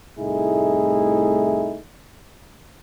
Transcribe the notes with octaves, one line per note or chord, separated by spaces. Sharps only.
C2 A2 A3 D#4 E4 G#4